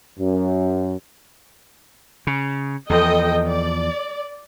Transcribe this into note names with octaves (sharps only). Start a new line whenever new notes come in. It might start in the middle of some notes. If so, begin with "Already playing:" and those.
F#2
C#3
E2 F3 A4 D#5 G5
D5